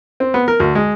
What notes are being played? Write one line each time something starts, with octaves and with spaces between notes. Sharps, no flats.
C4
B3
A#4
D2
G#3